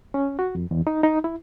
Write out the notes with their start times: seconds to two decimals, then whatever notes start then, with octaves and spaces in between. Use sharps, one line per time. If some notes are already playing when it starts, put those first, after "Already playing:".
0.14 C#4
0.39 F#4
0.55 F2
0.71 E2
0.87 D#4
1.03 D#4
1.24 E4